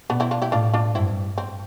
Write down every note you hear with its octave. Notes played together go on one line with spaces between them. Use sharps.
B2 B3 D4
C4 E4
D4 F4
E4 G4
A2 D4 F4
D4 F4
G2 C4 E4
C4